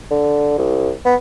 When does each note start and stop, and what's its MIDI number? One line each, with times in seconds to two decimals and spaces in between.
0.11 0.55 50
0.58 0.92 36
1.05 1.15 59